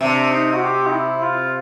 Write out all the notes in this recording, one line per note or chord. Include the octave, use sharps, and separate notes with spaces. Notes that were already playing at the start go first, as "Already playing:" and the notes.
C3 D4
D#4
F#4
G4
D#4
E4
F4